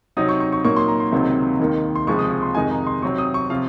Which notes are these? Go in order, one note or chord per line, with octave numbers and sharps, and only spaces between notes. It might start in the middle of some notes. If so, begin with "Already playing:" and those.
C3 F#3 C4 D#4 D#6
C#6
C#6
C#6
A#2 F#3 A#3 D#4 C#6
C6
A#5
C6
C#2 C3 D#3 F#3 C4
D#2 D#3 A#3
C6
C#2 C3 F3 G#3 C#6
D#6
C#6
C6
F2 C3 D#3 G#3 D#4 G#5
A#5
C6
C3 F#3 C4 C#6
D#6
C#6
C3 F3 F5